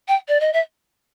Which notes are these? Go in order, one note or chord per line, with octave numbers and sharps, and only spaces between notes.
G5
D5
D#5
E5